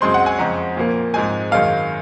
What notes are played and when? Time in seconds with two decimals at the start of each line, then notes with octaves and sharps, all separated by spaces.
0.01 F#2 C#3 G#3 C4 C6
0.14 F#5
0.26 G#5
0.39 F2 C#3 G#3 C4 A#5
0.77 A#2 F3 A#3
1.14 G#2 F3 G#3 C4 G#5
1.51 F#2 D#3 G#3 F5